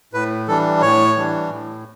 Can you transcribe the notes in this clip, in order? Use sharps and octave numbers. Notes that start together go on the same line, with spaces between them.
A2 B4
E3 G3 D4 A4
A2 C#5
E3 G3 D4
A2